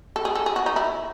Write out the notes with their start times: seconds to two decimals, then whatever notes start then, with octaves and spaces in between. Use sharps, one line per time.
0.16 A4
0.25 G#4
0.35 A4
0.46 G#4
0.56 F#4
0.66 D#4
0.76 E4